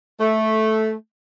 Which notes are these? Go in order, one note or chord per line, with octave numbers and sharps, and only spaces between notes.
A3